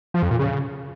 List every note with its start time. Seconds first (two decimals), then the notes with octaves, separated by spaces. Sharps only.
0.14 F3
0.23 F2
0.31 A#2
0.39 C#3